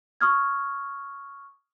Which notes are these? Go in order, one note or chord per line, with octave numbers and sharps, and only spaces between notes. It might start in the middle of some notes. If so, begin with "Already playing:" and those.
C#6 D#6 F6 G#6